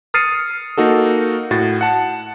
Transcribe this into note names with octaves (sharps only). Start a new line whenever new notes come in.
D#6 F6 A6 C7 C#7 D#7
A#3 D#4 F#4 A4
A2 F#4 A6
F#5 A5